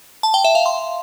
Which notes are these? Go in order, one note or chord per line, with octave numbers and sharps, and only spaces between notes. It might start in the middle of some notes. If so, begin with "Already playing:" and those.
A5
G5
E5
F5
C6